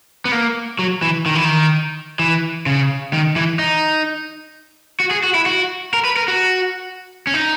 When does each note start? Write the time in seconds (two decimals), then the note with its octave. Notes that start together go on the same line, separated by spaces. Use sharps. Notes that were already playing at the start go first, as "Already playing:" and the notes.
0.25 B3
0.32 A#3
0.79 F#3
1.02 E3
1.26 D#3
1.35 E3
1.44 D#3
2.19 E3
2.66 C#3
3.13 D#3
3.36 E3
3.59 D#4
5.00 F#4
5.11 G#4
5.24 F#4
5.34 E4
5.46 F#4
5.94 A#4
6.05 B4
6.16 A#4
6.28 F#4
7.27 C#4
7.34 D#4